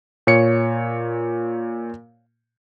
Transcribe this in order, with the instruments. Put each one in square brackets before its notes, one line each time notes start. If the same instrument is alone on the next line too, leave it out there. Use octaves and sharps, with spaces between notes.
[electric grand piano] A#2 C#5 C#7